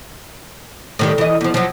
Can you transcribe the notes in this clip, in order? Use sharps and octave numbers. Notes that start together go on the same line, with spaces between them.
A2 D#3 G3
E3 D#5
E2 F3
F3 F#3